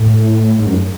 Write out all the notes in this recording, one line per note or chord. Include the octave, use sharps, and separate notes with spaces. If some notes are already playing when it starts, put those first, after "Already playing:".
Already playing: A2
G#2
F#2